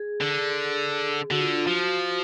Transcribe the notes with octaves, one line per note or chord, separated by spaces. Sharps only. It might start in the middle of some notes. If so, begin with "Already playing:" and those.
Already playing: G#4
D3
D3 F#4
F4
D4
F4
F3 F#4